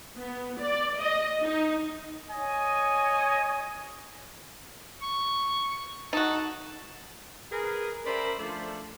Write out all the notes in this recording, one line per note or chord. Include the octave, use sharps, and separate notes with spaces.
B3
D5
D#5
D#4
C#5 D#5 G#5
C#6
D#4 F#4 A4
G#4 A#4 B4
C#4 A#4 C5 D5 E5 B5
F3 A3 D4 A4